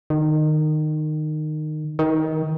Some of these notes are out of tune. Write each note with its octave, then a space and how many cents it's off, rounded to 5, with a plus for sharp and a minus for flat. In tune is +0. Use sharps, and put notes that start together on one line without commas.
D#3 -20
D#3 +20